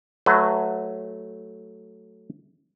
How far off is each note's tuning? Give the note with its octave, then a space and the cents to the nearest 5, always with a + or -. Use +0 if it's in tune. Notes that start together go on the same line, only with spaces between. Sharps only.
F#3 +0 A3 +0 B4 +40